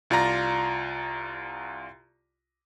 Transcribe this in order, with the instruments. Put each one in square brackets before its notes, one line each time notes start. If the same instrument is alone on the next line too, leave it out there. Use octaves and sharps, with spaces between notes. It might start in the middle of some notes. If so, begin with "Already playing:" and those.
[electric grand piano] C2 F4 D5 A#5 A#6